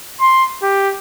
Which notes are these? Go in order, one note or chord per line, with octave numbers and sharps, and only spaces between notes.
C6
G4